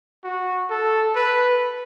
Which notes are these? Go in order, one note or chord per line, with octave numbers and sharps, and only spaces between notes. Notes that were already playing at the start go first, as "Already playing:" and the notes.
F#4
A4
B4